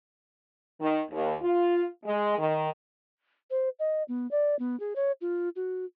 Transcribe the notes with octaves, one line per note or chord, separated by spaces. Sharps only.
D#3
D#2
F4
G#3
D#3
C5
D#5
B3
D5
B3
G#4
C#5
F4
F#4